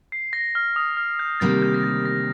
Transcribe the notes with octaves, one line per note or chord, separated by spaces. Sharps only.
C7
A#6
F6
D#6
F6
G6
D2 C3 D#3 G3 A#3 A6
G6
A#6
A6
A#6